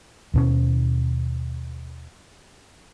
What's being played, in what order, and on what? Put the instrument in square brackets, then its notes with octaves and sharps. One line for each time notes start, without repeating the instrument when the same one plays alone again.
[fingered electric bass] D#2 B2 C#4